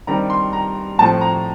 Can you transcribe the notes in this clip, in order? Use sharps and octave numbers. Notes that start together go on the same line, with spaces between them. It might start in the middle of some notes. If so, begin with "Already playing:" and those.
G2 D#3 G3 C4 A#5
C6
A#5
A2 F3 A3 C4 A5
A#5